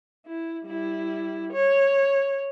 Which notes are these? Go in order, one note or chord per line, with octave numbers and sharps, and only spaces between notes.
E4
G3 E4
C#5